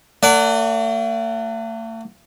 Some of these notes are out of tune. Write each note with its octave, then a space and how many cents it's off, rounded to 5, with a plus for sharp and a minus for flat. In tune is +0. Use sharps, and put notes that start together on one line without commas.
A3 +40 D5 -20 F#5 +10